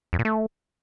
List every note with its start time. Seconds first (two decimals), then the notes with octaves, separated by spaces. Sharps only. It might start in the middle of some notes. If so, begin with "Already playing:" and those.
0.13 F2
0.19 A#2
0.25 A3